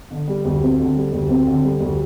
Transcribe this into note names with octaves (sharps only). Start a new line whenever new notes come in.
D3
G3
D2
C4
D3
G3
D2
C4
D3
G3
D2